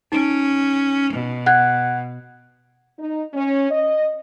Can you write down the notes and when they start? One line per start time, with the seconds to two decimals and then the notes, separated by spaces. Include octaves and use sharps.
0.12 C#4 D#4 D7
1.13 B2
1.46 F#5 F#6 G#6
2.98 D#4
3.34 C#4
3.71 D#5